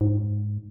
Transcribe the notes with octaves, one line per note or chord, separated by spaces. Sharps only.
G#2